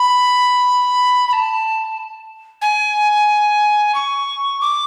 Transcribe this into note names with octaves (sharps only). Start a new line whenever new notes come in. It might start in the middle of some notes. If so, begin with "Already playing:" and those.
Already playing: B5
B5
A5
G#5
C#6
D6